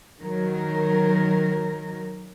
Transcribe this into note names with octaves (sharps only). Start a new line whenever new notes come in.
D#3 F#3 A#4